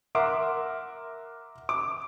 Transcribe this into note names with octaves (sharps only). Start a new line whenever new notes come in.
A#4 E5 F#5 C6 D6
D6